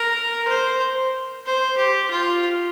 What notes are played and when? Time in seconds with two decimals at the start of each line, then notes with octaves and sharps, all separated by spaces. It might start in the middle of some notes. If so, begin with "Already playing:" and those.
Already playing: A#4
0.47 C5
1.46 C5
1.77 G4
2.10 F4